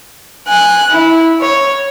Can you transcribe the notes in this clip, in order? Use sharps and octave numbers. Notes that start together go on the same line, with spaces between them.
G#5 F#6
E4
C#5